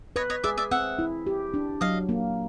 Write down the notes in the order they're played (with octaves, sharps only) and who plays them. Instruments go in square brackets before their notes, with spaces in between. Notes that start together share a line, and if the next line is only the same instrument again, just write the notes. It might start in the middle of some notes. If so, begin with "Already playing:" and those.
[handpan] B4 [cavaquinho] C#5 D#5
[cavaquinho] C#5 D#5
[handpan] G#4 [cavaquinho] D5 E5
[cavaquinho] D5 E5
[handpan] C4 [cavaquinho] E5 F#5
[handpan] E4
G4
D4
[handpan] F#3 [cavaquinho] D#5 F5
[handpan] A#3